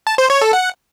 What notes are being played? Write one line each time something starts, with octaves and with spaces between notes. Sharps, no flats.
A5
C5
C#5
A4
F#5